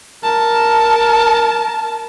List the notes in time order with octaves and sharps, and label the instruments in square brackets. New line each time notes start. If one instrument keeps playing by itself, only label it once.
[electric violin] A#4 A5